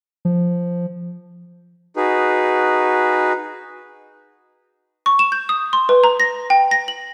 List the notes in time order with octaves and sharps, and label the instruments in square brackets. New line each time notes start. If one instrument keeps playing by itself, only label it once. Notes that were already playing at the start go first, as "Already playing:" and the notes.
[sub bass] F3
[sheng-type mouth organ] D#4 F#4 G#4 B4
[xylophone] C#6
E7
G6
D#6
C6
B4
A#5
A#6
G5
A#6
F#7